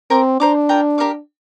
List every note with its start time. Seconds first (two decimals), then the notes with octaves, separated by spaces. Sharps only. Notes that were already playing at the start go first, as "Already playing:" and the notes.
0.10 C4 A#4 G5 D6
0.40 D4 C5 A#5 D6
0.69 F4 A#4 G5 A#5
0.98 G4 A#4 F5 D6